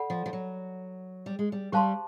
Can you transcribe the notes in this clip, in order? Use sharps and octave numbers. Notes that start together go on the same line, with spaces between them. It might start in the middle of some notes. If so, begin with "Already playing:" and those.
Already playing: A4 D5 F#5 B5
F3
F3
F#3
G3
G#3
G3
G3 G4 C5 F5 A5 C6